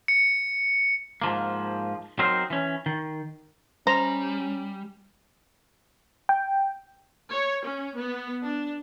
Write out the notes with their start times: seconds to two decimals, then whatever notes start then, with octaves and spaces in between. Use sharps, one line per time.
0.08 C#7
1.22 G#2 F3 A#3
2.19 F#3 C4 D#4 A#4 C5
2.50 E3 C#4
2.86 D#3
3.87 G3 C#4 C5 A#5
6.29 G5
7.32 C#5
7.67 C#4
7.99 B3
8.44 D4